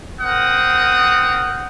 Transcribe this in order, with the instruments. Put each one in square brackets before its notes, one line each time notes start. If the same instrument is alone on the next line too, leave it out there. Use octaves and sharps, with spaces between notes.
[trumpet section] C4 A#4 F#5 D#6